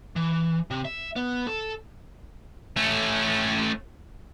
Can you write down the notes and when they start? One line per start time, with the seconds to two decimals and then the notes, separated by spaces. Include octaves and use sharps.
0.16 E3
0.71 C3
0.85 E5
1.16 B3
1.47 A4
2.77 A3 C#4